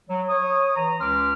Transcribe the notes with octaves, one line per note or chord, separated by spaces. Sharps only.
F#3
C#5 D#6
E3 A#5
C#2 C#4 B4 C6 D6 F6